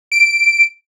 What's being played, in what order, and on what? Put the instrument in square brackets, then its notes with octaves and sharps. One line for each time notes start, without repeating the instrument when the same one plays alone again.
[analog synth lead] D7